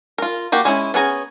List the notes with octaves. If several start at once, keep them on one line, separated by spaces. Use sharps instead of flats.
F4 A#4
A#3 F#4 G4
G#3 C#4 E4
B3 C#4 G#4 A#5